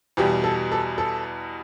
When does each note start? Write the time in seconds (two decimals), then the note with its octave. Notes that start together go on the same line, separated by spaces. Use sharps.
0.17 E2 B2 G3 G4
0.44 A4
0.72 A4
0.98 A4